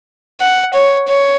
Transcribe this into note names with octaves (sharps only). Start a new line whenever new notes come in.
F#5
C#5
C#5